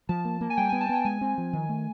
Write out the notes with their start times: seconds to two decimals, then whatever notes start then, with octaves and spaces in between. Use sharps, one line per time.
0.09 F3 A5
0.25 A#3
0.41 A#3
0.50 G#5
0.57 G3 G5
0.69 G#5
0.73 B3
0.81 A5
0.89 B3 G5
1.05 G#3 G#5
1.21 C4
1.38 F3
1.53 D#3
1.69 A3